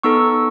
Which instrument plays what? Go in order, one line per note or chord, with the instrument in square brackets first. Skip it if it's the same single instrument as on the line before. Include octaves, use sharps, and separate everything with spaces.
[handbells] B3 D#4 A4 C#6 E6